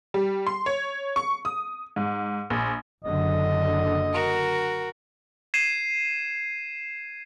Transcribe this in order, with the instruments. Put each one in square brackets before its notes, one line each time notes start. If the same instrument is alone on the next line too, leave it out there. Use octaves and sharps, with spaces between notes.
[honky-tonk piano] G3
C6
C#5
C#6
D#6
G#2
A#1
[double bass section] F#1 D3 [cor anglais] D#5
[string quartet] F#4 A#4
[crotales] G#6 C7 D#7 E7